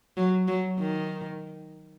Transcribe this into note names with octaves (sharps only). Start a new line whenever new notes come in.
F#3
F#3
D#3